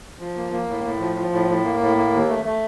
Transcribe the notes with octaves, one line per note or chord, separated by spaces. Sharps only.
F3
A#3
A#3
A2
A2
F3
F3
A2
A2
A#3
A2
A#3
D#2
A3
A3